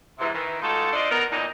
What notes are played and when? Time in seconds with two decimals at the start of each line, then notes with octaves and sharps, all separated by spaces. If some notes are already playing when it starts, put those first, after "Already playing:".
0.19 G#2 C3 E3
0.33 D#3 E3
0.62 G#3 A3 D#4 F4 F#4 A4
0.93 D4 F4 A4 C5 D5 D#5
1.11 B3 D#4 F#4 A#4
1.32 E2 A#2 F#3 D4 D#4